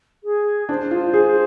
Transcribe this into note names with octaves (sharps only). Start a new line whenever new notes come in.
G#4
D4 C5
F4
G#4